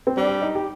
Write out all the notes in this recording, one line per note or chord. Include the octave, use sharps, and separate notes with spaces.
C4
G3 D4
D4
D#4
G4